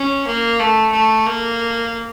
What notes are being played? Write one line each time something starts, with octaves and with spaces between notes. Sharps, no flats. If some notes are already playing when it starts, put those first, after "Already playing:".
Already playing: C#4
A#3
A3
A3
A#3